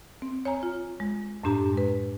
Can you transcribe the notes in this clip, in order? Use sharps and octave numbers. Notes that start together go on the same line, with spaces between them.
C4
C#5 G#5 A#5
F4
G#3
F#2 A2 D4 G4 A#5
G#3 B4